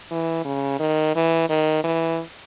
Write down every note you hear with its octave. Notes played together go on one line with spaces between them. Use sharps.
E3
C#3
D#3
E3
D#3
E3